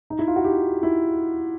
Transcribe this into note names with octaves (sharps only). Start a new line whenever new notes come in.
D#4
E4
F4
F#4
G4
E4